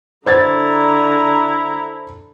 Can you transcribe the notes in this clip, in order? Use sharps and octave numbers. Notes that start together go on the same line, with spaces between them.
D3 E4 C5 A#5 G#6 A6